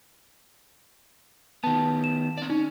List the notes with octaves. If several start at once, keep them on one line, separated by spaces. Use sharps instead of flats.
D#3 B3 A5
E7
C4 D5
C#4 D#4